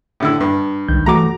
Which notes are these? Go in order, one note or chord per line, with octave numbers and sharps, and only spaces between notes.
A2 D3 E4
G2
C2 G#2 D#3 G6
G2 E3 A3 F#4 A#5 D6